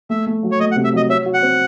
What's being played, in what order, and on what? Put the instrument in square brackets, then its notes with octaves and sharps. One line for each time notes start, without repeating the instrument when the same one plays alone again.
[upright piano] A3 [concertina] E5
[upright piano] A3
F#3
[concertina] C#5
[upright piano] A3 [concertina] D#5
[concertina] F#5
[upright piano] C3
[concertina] E5
[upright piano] F#3 [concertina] D#5
[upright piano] C#5 [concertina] E5
[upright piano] F#4
[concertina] F#5
[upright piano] C4